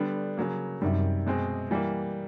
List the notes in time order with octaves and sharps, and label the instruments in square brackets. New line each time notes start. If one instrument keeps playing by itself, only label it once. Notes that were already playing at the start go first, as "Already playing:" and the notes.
Already playing: [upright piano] D3 G3 B3 D4
C#3 F#3 A#3
[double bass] F#2 [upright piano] C3 D#3 G3
[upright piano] B2 G#3 C4
E3 G3 A#3